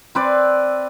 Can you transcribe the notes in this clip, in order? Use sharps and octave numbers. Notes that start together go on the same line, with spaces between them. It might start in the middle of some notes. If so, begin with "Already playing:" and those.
C4 B4 D5